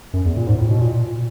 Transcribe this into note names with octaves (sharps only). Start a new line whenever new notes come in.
F#2
E2
A#2
G#2
A2
B2
A#2